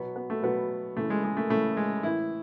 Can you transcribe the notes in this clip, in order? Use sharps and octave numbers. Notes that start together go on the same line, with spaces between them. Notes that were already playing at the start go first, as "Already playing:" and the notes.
Already playing: B2 F#3 B3
B3
A3
B2 F#3 B3
C#3 E3 A3
G#3
G#3
A3
C#3 E3 A3
G#3
A2 E3 E4